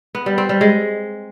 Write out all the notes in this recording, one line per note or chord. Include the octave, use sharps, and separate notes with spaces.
B3
G3
C4
G3
G#3